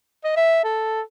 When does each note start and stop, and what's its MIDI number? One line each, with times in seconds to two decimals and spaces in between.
0.24 0.32 75
0.37 0.63 76
0.64 1.02 69